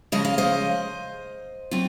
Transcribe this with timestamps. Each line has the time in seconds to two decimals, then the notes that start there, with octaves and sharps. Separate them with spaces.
0.12 C#3 F3 G#3 D#5
0.25 F5
0.38 C5 D#5
1.71 F#3 C4 F4